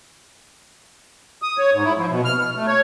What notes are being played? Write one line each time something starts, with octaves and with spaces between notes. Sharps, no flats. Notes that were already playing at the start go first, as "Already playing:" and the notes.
D#6
C#5
G#2
E4
F3
B2
F6
F6
A3
C#5